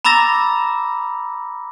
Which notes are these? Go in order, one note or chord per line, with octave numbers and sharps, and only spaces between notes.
A#5 B5 D6 E6 A6 A#6